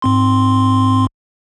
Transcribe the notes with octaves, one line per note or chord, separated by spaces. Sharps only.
G#2 C4 C6